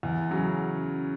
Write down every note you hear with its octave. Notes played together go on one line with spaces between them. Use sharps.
E2
C#3 F#3 C#4